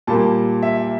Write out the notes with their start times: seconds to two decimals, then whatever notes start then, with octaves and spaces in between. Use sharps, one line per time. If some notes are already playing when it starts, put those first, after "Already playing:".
0.07 A#2 G3 A#3 A5
0.62 E5